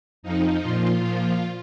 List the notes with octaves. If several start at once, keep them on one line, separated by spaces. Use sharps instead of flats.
F2 F3 D#4
A#2 F3 F4
A#2 F3